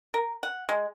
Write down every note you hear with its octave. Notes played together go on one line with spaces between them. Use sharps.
A#4
F#5
G#3